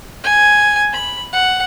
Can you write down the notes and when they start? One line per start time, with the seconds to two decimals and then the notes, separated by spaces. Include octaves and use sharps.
0.24 G#5
0.93 B5
1.33 F#5